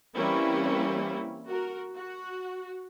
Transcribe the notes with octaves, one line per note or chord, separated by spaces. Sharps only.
E3 G3 A#3 C4 C#4 E4
F#4 A#4
F#4